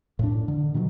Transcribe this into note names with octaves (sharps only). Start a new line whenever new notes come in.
A2 D4
D3
B2 D#3 F3 F#3